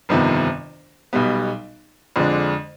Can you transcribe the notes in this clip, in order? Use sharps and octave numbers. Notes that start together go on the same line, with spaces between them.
G1 F2 C3 D#3 B3
B1 B2 G3 B3
F2 D3 G#3 D4